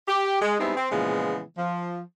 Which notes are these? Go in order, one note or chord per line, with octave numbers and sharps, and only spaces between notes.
G4
G#3
G3 G#3 B3 C4 D#4 E4
C4
A#2 C#3 E3 F3 G#3 B3
F3